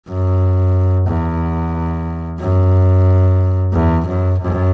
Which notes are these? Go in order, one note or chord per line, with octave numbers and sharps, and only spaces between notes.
F#2
E2
F#2
E2
F#2
F#2